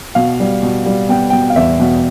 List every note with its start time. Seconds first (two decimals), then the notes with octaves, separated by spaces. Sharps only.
0.15 B2 F5
0.40 G3
0.63 B2
0.86 G3
1.09 B3 G5
1.30 B2 G5
1.50 F5
1.56 E2 E5
1.80 B2